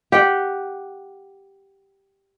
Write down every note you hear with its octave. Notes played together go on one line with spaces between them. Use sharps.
G4 F#5 G5